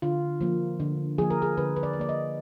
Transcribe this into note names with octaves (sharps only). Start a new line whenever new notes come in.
D3 F4
F3 A#3
D3
F3 A#3 G#4
A#4
G#4
D3 B4
B4
D5
B4
F3 A#3 D5
D#5